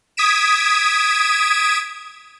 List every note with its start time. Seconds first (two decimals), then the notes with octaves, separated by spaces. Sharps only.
0.17 D#6 G#6 B6 D7 E7